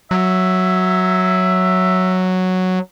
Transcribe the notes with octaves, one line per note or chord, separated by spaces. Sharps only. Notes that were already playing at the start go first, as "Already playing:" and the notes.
F#3 E5